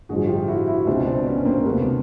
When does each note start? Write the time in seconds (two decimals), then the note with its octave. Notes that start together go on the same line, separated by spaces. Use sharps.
0.09 A1 G2 D3 F3 F#4 G#4
0.29 F4 G4
0.48 E4 F#4
0.67 E4 F#4
0.87 C#2 B2 C4 D4
1.07 C4 D4
1.26 B3 C#4
1.45 A#3 C4
1.65 E1 D2 C3 A3 B3